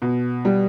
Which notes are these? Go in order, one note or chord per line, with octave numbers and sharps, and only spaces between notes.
B2
G3